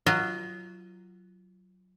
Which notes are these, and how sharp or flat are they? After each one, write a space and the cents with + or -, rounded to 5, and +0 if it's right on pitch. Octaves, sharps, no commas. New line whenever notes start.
F#3 +0 F4 -25 D#5 +0